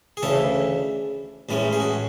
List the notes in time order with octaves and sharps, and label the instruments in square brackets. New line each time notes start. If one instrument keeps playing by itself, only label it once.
[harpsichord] G#4
D2 C#3 E3 A4
A1 A2 E3 G#3 C#4
G#4
F#4